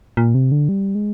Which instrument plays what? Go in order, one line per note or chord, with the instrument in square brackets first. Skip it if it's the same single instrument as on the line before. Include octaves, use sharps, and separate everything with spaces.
[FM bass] A#2
C3
D3
G3
G#3